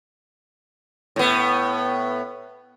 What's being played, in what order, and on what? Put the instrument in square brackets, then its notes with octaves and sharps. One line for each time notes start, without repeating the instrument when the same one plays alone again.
[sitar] A2 B3